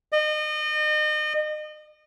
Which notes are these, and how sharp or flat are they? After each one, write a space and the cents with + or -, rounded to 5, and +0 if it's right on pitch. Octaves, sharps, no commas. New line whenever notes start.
D#5 -35